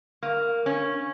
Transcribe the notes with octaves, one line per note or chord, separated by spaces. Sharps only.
A#3
C#4